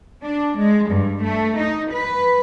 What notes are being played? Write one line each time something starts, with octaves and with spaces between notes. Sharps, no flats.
D4
G#3
G2
A3
D#4
B4